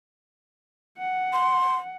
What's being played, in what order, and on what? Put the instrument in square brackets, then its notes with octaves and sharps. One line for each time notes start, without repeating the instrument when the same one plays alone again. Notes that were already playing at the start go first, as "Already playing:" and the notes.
[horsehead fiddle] F#5
[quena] C6